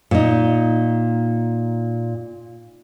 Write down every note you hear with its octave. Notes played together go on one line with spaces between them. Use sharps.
A#2 D#4